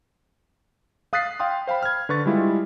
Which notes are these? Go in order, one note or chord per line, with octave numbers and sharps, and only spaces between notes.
F5 D#6 F#6 A6 B6 C7
F5 G5 C6 D#6
C5 F5 G5 B5
F6 G#6
D3 B4 C#6 A6
G3 G#3 E4 F4